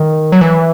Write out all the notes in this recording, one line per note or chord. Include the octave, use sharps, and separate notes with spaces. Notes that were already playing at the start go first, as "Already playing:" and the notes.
Already playing: D#3
F#3
E3